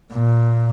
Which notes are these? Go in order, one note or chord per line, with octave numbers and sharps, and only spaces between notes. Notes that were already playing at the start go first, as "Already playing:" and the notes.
A#2